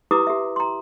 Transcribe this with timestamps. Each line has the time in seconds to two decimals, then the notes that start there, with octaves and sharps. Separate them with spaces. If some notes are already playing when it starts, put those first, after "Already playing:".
0.11 E4 G4 B4 A#5 D6 D#6
0.27 G4 E5
0.56 A#5 C6